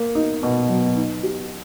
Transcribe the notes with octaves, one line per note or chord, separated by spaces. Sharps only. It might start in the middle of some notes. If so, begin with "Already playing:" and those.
Already playing: A#3
D#4
B2
F#3
D#4
G4